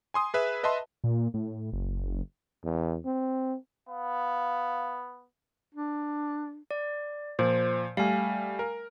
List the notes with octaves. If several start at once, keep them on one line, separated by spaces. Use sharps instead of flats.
G#5 C6 D#6
G#4 B4 E5
B4 D#5 E5 A5 C6
A#2
A2
F#1
E2
C4
B3 F5
D4
D5
A#2 F3 C5
G3 A3 F5 G#5
A#4